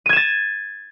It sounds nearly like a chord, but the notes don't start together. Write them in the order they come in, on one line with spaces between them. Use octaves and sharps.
D#7 G#6 E7 A6